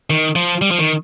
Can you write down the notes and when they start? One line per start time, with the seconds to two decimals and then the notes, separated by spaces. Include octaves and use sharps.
0.10 D#3
0.36 F3
0.62 G3
0.71 F3
0.79 D#3